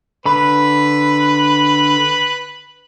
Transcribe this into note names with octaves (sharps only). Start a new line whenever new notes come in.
D3 B4 B5